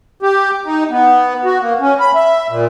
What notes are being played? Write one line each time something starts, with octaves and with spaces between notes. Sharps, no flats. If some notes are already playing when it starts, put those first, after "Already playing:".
G4
D#4
B3
F#4
A#3
C#4
B5
E5
A#2